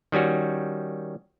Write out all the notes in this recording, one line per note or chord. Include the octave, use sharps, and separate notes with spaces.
D#3 G3 C#4 F#4